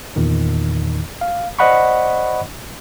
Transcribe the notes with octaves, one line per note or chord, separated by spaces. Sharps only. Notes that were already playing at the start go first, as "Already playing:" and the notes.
E2 A#2 D#3
F5
C5 D5 D#5 F#5 B5 C#6